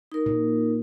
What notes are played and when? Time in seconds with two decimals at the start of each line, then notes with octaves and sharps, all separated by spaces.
0.12 D#4 A#4
0.26 A#2